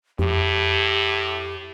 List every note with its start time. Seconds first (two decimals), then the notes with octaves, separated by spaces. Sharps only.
0.19 F2 A2 G4